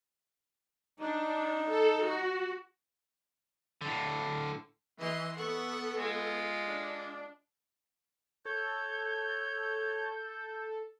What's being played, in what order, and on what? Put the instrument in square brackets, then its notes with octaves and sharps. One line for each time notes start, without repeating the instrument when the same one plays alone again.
[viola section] D4 [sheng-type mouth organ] D#4
[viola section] A4
F#4
[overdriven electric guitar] A2 D3
[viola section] E3 [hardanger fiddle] D#5 C6
[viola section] B3 A4 [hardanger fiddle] F#5 C#6
[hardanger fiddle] G#3 F4
[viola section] D4
[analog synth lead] A4 [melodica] C#5 [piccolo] G6